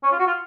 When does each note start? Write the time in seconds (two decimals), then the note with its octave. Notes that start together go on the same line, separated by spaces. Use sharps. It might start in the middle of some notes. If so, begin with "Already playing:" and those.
0.03 C#4
0.12 F4
0.19 F#4
0.27 F4